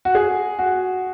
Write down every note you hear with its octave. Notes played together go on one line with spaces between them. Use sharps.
F#4
G#4
F#4